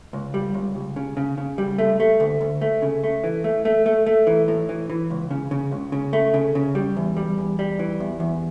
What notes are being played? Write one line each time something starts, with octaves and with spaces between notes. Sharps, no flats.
C#2
G3
C#2
C#2
C#3
C#3
C#3
G3
A3
A3
D2
D2
A3
C#3
A3
E3
A3
A3
A3
A3
E3
A2
E3
E3
C#2
C#3
C#3
C#2
C#3
A3
C#3
C#3
G3
E2
G3
E2
G3
E3
E2
E2